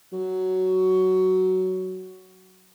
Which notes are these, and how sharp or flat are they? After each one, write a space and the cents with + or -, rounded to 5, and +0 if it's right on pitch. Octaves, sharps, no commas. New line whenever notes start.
F#3 +10